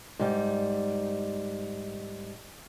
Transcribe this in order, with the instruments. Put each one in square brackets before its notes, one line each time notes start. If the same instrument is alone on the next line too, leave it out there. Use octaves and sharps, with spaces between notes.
[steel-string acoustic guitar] G#2 G3